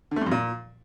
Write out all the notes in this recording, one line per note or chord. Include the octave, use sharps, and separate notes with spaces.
D3
A3
G2
F2
A#2